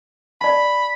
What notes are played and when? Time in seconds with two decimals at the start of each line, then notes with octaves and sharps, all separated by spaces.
0.41 D5 A5 B5